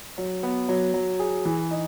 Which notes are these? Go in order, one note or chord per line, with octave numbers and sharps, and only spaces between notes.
F#3
B3
F#3
F#3
G#4
E3
D#4